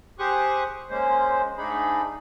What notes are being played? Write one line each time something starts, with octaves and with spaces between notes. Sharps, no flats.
G4 G#4 C5 C#6 D#6 F#6
G#3 A#3 C#4 C5
G#2 A3 D4 D#4 G#4 B5